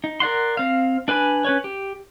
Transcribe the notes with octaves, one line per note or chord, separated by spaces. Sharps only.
D#4
A#4 D5 F#5 C6
C4 F5
D4 B4 G#5 B5
C#4 B4 C#5
G4